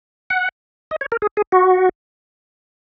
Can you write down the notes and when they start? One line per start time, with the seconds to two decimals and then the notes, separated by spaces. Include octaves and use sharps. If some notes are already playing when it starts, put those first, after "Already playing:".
0.30 F#5
0.91 D#5
1.01 C#5
1.12 A#4
1.22 G#4
1.37 G#4
1.52 F#4